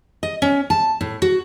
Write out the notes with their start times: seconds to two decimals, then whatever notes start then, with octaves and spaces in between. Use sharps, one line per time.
0.23 D#5
0.42 C#4
0.70 A5
1.01 A2
1.22 F#4